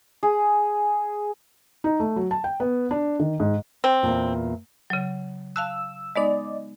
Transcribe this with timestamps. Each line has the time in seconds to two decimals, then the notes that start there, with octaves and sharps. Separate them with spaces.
0.23 G#4
1.84 D#4
2.00 A3
2.16 F#3
2.31 A5
2.44 G5
2.60 B3
2.91 D4
3.19 D#3
3.40 G#2
3.84 C4
4.03 E2 G2 A#2
4.90 C#3 F#3
5.56 F5 A5 E6 F#6
6.16 G#3 B3 D#4 D5 D#5